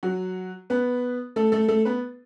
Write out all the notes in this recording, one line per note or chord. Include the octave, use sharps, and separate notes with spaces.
F#3 F#4
B3 B4
A3 A4
A3 A4
A3 A4
B3 B4